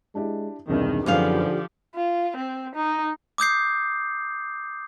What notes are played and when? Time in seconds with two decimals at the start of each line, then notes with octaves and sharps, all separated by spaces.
0.15 G#3 D4 E4 G4
0.68 E1 C2 G2 D#3 G#4
1.06 F#2 D3 F3 B3 D#4 G4 G#4 F5
1.95 F4
2.36 C4
2.75 D#4
3.38 D6 D#6 G6 C7